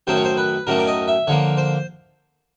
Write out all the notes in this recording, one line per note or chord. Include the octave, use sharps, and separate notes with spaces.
F#2 D#3 F#3 A3 C#4 C5
C#5
C5
B4
F#2 D#3 F#3 A3 C#4 A#4
D5
D#5
E5
D3 F3 A#3 C#5
C5